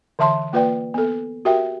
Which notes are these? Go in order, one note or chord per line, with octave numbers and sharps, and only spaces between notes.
D3 E3 E5 A5 C6
A#3 F4 B4 D5 G5
B3 A4
F#4 G4 A#4 E5 G5